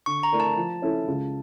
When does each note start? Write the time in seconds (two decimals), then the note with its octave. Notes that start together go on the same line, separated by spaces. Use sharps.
0.06 D3 C#6
0.23 A#5
0.32 A3 E4 A#4 D5
0.40 A5
0.56 F3
0.82 C#4 E4 A4
1.08 C#2